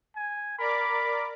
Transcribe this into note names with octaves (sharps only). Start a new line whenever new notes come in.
G#5
A#4 D5 B5 D6